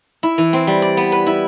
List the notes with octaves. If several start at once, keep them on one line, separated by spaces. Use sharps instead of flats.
E4
E3
C4
G3
D5
B3
B4
E4